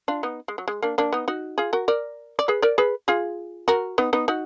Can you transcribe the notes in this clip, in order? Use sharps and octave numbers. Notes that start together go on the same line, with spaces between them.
D4 F4
B3 D#4
G#3
F#3
G#3
A#3 D4
A#3 D4
B3 D#4
D#4 F#4
F4 G#4
F#4 A#4
A#4 D5
D5
G#4 B4
A#4 D5
G#4 B4
F4 G#4
F#4 A#4
B3 D#4
B3 D#4
D#4 F#4